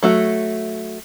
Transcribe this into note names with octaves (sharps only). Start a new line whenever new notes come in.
F#3 A3 F#4